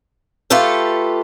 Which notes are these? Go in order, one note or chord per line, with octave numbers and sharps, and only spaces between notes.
A3 F4 G4 A4 B4